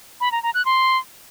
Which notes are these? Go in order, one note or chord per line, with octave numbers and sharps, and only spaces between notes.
B5
A#5
A#5
F#6
C6